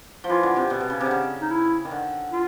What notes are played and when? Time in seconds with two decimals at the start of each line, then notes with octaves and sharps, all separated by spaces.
0.24 F3
0.29 E3 F4
0.43 D3
0.56 C3
0.70 B2
0.80 B2
0.90 C#3
1.00 C3
1.06 D3
1.11 C#3
1.42 D#4
1.51 E4
1.85 D#3
1.91 D3
2.31 F4